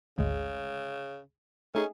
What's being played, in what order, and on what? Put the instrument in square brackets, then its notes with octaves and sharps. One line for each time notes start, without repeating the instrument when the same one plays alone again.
[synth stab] G#1 D2 G#3 [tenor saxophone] C#3
[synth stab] A3 D#4 G#4 [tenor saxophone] C#4